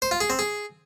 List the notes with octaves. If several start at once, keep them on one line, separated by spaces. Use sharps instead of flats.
C5
F4
G#4
C4
G#4